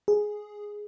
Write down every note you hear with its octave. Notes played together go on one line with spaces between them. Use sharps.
G#4